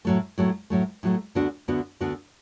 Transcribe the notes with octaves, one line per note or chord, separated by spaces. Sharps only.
A2 F#3 A3
A2 F#3 A3
A2 F#3 A3
A2 F#3 A3
D2 D3 B3 D4 F#4
D2 D3 B3 D4 F#4
D2 D3 B3 D4 F#4